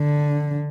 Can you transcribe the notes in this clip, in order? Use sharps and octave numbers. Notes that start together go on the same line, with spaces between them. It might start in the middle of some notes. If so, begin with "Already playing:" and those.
Already playing: D3